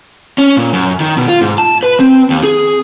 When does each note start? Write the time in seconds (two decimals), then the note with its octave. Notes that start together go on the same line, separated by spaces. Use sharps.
0.38 C#4
0.57 A#2
0.73 F#2
1.00 D#3
1.17 B2
1.28 F4
1.41 G#2
1.58 A5
1.83 B4
2.00 C4
2.30 D#2
2.43 G#4